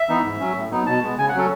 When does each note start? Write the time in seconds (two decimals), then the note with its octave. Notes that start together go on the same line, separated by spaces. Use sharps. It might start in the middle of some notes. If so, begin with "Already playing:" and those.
Already playing: E5
0.09 E3 B3 D#4
0.24 G#2
0.40 F#3 C#4
0.56 A2
0.71 F#3 B3 D#4
0.86 B2 A5
1.03 G#3 B3
1.18 C#3 G#5
1.29 F#5
1.34 F#3 C#4 A4